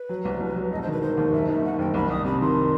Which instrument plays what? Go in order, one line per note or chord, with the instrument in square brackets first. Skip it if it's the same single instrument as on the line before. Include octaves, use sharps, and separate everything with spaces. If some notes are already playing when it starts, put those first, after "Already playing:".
Already playing: [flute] B4
[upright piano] F#3
C2
C2
F#3
[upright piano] E1 [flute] D#5
[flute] C5
[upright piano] D#3 [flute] B4
[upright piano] D#3 [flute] C5
[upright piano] D#2
[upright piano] F#1 [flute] E5
[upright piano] D#3 [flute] E5
[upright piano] D#3 [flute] F#5
[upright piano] F#1 [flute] G5
[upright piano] C2 [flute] B5
[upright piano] C2 [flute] D#6
[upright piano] C3 [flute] B5
[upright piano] D#3 [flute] C6